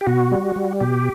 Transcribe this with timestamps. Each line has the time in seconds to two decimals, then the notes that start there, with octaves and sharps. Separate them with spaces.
0.01 G4
0.07 B2 F#4
0.32 G3
0.56 G3
0.80 B2 G4